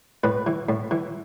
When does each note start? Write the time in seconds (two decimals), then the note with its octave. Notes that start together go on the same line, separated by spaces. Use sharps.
0.24 A2 B4
0.47 E3
0.69 A2
0.91 E3